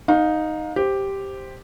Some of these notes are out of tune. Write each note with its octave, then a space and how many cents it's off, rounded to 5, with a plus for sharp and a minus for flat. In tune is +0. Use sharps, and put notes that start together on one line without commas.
D#4 +0 F5 +30
G4 +0 C5 +0